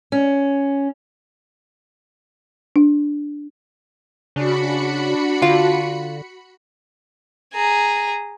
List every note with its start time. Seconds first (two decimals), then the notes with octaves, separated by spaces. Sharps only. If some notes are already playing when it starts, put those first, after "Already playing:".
0.12 C#4
2.76 D4
4.36 C#3 D4 F#4 B5 C#7
5.42 D3 F4
7.54 G#4 A#5